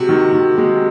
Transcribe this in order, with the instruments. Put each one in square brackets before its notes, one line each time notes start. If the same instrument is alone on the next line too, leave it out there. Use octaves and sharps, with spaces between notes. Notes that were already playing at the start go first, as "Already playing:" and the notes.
Already playing: [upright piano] C3 G#3 [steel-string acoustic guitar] F#4
[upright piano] D#3
D#3
G#3